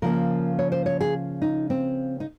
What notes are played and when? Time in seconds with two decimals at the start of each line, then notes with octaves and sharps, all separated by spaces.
0.02 C#3 F3 A#3 A#4
0.59 C#5
0.72 C5
0.86 C#5
1.01 G#4
1.42 D#4
1.70 C4
2.20 D#4